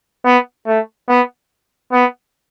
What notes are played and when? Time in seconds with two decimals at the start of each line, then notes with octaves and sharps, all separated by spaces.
0.25 B3
0.67 A3
1.09 B3
1.92 B3